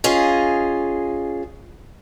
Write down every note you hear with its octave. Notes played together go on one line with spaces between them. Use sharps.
C#4 F4 G#4 D#5